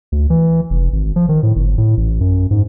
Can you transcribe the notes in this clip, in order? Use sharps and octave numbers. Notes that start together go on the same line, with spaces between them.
D2
E3
F1
G#1
F3
D#3
A2
G1
A2
A1
F#2
G#2